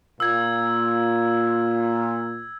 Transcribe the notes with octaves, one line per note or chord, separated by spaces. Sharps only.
A#2 E6 G#6